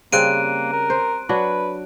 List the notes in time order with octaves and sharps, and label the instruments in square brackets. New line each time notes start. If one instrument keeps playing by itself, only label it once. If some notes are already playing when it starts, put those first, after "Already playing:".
[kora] C#3 G3 C4 [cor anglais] A#3 [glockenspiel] F#6 D7 D#7
[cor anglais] A#4
[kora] C5
[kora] F#3 D4 F#4 [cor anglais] B4